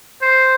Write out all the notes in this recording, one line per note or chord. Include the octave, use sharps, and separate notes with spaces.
C5